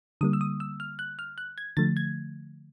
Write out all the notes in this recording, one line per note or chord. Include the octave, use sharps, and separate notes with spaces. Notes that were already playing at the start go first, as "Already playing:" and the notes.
D3 G3 A#3 D#6
E6
D#6
E6
F6
F#6
F6
F#6
G#6
D3 F3 A3 A6
G#6